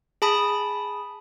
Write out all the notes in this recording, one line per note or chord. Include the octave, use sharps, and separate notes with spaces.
G#4 A5 B5 D#6